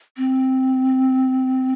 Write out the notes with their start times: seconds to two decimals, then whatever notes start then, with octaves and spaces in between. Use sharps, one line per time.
0.17 C4